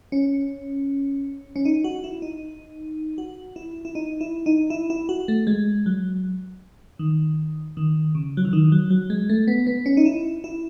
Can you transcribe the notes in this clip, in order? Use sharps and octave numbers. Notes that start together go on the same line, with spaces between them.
C#4
C#4
D#4
F#4
E4
D#4
F#4
E4
E4
D#4
E4
D#4
E4
E4
F#4
A3
G#3
F#3
D#3
D#3
C#3
F#3
E3
D#3
F#3
F#3
G#3
A3
B3
B3
C#4
D#4
E4
E4